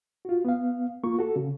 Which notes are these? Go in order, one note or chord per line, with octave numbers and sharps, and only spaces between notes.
F4 F#4
B3 F5
A#3 F4 C#6
F#4 A4
C#3